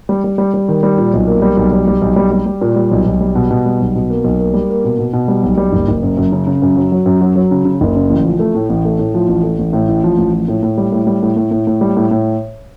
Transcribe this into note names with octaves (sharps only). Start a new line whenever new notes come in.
G3
G3
G3
G3
D#3
G3
A#2
B1
A#3
G3
B1
G3
G3
B1
G3
G3
G3
A#2
G3
B1
B1
G3
B2
B2
G3
B1
B2
A#3
B1
A#3
G3
A#3
B2
B2
B2
G3
B1
G3
F#1
F#1
F#2
F#2
C#3
C#3
F#2
F#3
F#3
F#2
F#3
F#3
C#3
C#3
F#1
C#3
A1
F3
A3
A2
A1
A3
A2
F3
A1
A3
A1
A2
A1
F3
A1
F3
A2
A2
G3
A2
G3
A2
A2
A2
A2
G3
A2
A2